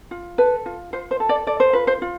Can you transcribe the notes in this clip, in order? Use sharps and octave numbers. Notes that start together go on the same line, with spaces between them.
F4
A4 B4
F4
F4 C5
C5
A4
D5
A4 D5
C5
F4 B4
C5
F4